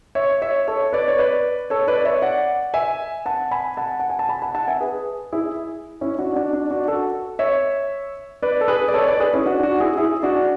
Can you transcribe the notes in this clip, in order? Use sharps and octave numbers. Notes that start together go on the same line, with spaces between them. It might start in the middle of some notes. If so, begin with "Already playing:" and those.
C#5 E5
C#5 E5
A4 C#5
B4 D5
C#5
B4 D5
A4 C#5
B4 D5
C#5 E5
D5 F#5
E5 G#5
F#5 A5
G#5 B5
F#5 A5
F#5
G#5
A5
G#5 B5
F#5 A5
F#5 A5
E5 G#5
G#4 B4
E4 G#4
C#4 E4
D4 F#4
D4 F#4
D4
D4 F#4
F#4 A4
C#5 E5
B4 D5
A4
G#4 B4
D5
A4 C#5
B4 D5
G#4 B4
C#4 E4
D4 F#4
D4 F#4
E4 G#4
E4 G#4
D4 F#4